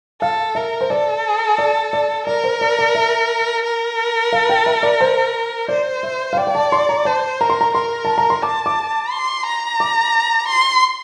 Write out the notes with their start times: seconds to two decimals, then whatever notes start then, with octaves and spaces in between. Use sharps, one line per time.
0.21 A4 F5
0.55 A#4 E5
0.81 C5
0.90 A4 D5
1.58 D5
1.93 D5
2.26 A#4 D5
2.44 C5
2.61 D5
2.79 D5
2.95 E5
3.64 A#4
4.33 F5
4.50 G5
4.66 E5
4.83 D5
5.01 C5
5.68 C5 D5
6.03 E5
6.33 F5
6.37 D5 G5
6.47 G5
6.55 A5
6.72 C6
6.89 A#5
7.05 C5 A5
7.40 A#4 A#5
7.50 C6
7.61 A#5
7.75 A#4 C6
8.05 A5
8.18 A#5
8.30 C6
8.43 A5 D6
8.66 D6
9.11 C6
9.46 A#5
9.80 D6
10.48 C6